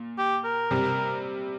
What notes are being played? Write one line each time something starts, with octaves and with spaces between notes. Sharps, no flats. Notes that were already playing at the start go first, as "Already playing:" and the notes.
Already playing: A#2
G4
A#4
C3 G3